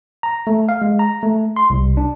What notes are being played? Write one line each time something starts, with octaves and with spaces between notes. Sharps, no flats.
A#5
A3
F5
G#3
A#5
A3
C6
C2
D4